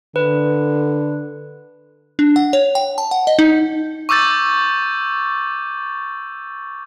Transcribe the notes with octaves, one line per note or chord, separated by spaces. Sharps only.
D3 B4
D4
F#5
C#5
G5
A5
F#5
D#5
D#4
C#6 D6 E6 G6 A6